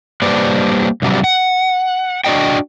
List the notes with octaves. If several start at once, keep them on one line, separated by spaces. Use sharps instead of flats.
G3 A#3 D4 B4 C5 D5
G2 C3 F#3 G3
F#5
D4 F#4 D5 D#5 G5